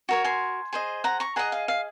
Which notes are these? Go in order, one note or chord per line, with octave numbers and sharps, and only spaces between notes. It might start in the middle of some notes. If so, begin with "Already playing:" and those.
F#4 A#4 C#5
G#5 C6
G#4 C5 D#5
F#5 A#5
A#5 C#6
G#4 D#5 F#5 A#5
F5
F5